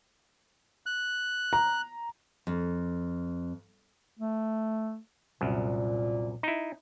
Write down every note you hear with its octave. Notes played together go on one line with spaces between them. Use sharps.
F#6
A#5
F2
A3
C2 F#2 A#2
D#4 E4